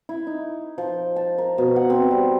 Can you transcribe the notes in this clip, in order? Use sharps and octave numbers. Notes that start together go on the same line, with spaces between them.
E4
D#4
F3
A5
A#4
B2
F#5
C4
G3